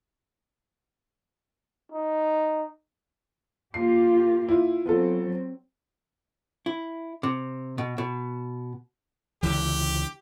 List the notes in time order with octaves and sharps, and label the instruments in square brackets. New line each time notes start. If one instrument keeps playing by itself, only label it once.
[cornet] D#4
[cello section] A#3 F4 G4 [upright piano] C7
[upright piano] E4 F4
[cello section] F#3 C4 [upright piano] B3 F4 A4
[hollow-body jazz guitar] E4
C3
B2
B2
[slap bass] C#2 D3 E3 [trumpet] G4